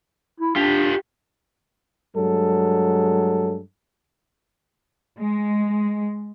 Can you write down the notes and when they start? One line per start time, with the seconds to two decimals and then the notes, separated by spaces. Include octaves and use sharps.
0.40 E4
0.56 D4 F4 G4
2.15 G2 F#3 G#3 A4
5.20 G#3